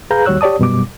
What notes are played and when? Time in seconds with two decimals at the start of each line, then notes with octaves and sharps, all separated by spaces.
0.11 G#4 B4 F5 A#5 G6
0.25 D#2 G3 F#4 C#5 E6 F#6
0.41 G4 C#5 D5 A5 D#6
0.59 F#2 B2 G3 D6